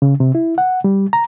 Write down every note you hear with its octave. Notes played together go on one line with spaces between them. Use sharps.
C#3
C3
E4
F#5
G3
A#5